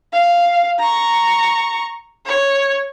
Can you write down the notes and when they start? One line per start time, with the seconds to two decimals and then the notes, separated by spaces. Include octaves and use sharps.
0.13 F5
0.79 A#5 C#6
2.26 C#5